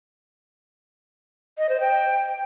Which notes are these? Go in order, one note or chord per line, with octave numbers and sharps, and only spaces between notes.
D#5
C5
G5